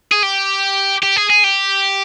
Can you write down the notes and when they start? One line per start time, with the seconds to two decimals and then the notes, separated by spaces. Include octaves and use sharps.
0.12 G#4
0.23 G4
1.03 G4
1.16 G#4
1.30 G#4
1.44 G4